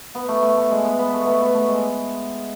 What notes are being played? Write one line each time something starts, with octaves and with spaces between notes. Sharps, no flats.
B3
A3
A3
A3
G#3
B3
B3
A3
B3
A3
B3
A3
G#3